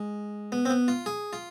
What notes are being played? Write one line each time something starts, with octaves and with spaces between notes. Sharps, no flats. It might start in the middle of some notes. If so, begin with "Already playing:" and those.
Already playing: G#3
B3
C4
B3
F4
G#4
F4